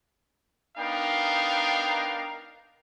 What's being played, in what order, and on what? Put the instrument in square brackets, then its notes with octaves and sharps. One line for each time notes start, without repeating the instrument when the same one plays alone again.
[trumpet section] B3 D4 D#4 A#4 F5 G5